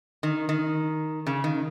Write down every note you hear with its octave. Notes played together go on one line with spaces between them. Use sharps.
D#3
D#3
C#3
D#3